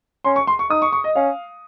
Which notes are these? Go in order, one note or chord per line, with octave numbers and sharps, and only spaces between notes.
C#4 C6
C#6
C6
C#6
D#4 D#6
C#6
C#6
D#5
C#4 F5